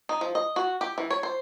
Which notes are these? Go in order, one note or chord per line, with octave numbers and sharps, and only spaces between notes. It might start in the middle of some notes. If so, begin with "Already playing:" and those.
D#4
F3
D#5
F#4
G4
E3
C#5
C5